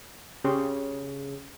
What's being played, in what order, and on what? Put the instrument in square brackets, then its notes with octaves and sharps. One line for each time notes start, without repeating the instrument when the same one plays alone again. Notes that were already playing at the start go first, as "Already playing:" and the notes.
[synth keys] C#3 [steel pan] G4 C#5 C6